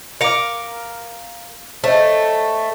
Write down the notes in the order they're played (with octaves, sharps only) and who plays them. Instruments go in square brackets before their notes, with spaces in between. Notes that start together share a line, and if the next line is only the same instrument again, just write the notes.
[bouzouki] A#4 F5 [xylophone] D6 C#7
[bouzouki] A3 [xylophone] C5 C#5 D#5